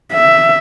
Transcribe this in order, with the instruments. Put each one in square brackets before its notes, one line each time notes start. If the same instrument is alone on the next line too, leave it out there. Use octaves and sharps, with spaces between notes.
[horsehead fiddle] E5